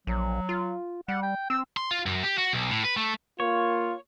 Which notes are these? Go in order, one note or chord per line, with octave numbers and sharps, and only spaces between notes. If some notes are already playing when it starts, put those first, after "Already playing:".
A#1 F#3
F4
G3 F#5
G5
C4 E6
C6
F4
F#2
G4
F#4
B1
A2
B4
A3
A#3 F4 C#5